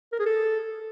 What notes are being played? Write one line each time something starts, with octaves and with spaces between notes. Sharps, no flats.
A#4
G#4
A4